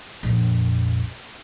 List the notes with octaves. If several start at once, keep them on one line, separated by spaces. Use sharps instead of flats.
A#1 F2